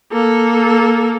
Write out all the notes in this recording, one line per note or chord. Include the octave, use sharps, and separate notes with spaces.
A#3 A4